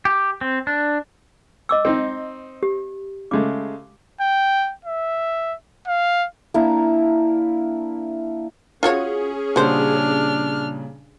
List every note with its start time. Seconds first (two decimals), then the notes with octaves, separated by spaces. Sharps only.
0.05 G4
0.41 C4
0.67 D4
1.69 D#5 D6 E6
1.85 C4 D#4
2.63 G4
3.31 C#3 G#3 A3 D6
4.21 G5
4.85 E5
5.87 F5
6.54 A#3 D4 E4
8.83 C#4 F4 F#4 G#4 C#5
9.56 A#2 C#3 G3 D4 F#4 C5 F6